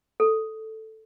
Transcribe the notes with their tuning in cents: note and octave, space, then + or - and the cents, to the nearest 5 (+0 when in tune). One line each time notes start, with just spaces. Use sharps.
A4 +0